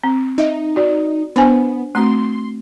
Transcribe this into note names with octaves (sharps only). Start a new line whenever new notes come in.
C4
D#4 D#5 E5
F#4 D5
B3 D4 C5 G#5
A3 C4 F#4 C6